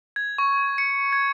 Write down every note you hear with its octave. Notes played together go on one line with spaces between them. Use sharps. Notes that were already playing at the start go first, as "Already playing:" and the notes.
G#6
C#6
C#7
G#6